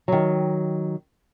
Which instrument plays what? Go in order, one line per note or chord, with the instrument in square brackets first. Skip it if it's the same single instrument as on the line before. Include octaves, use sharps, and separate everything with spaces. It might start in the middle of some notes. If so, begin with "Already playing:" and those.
[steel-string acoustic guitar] D#3 F#3